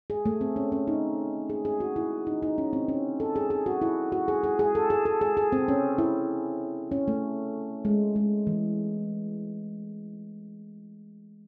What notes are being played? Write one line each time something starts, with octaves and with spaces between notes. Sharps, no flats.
G#4
A3
C4
C#4
C#4
D#4
G#4
G#4
F#4
E4
D#4
D#4
C#4
C4
C#4
A4
G#4
G#4
F#4
E4
F#4
G#4
G#4
G#4
A4
G#4
A4
G#4
G#4
C4
C#4
E4
C#4
A3
G#3
G#3
E3